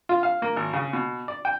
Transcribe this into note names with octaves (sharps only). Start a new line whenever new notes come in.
F4
F5
A#3
G#1
C#3
B2
D5
G5